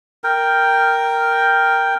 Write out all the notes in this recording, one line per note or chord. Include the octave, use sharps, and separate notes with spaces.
A#4 G5